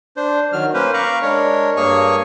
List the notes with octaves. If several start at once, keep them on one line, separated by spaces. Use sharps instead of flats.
D4 C5
D#3 F#3 F6
A#3 C#4 B4 C5
F5 A#5 B5 C#6 D6
G#3 D4 A#4 C#5
G2 A#3 G#4 C#5 G#5 C#6